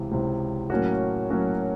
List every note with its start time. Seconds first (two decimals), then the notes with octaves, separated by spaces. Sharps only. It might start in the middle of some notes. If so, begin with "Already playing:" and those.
Already playing: C#2 C3 E3
0.11 C#2 C3 E3
0.70 A2 F#3 A#3 C#4 F#4
1.30 A2 F#3 A#3 C#4 F#4